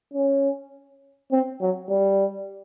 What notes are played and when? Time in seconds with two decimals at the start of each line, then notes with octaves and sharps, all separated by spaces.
0.14 C#4
1.32 C4
1.61 F#3
1.90 G3